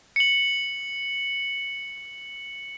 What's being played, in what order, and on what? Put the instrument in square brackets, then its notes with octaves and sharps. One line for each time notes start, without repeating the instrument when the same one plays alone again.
[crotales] C#7 F#7